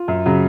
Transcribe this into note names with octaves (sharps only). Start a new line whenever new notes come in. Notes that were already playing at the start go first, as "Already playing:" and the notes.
Already playing: F4
F#2
C#3 F#3